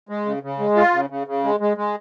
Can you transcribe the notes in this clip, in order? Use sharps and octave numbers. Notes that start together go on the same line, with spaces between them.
G#3
C#3
C#3
G#3
F4
C#3
C#3
C#3
G#3
G#3
G#3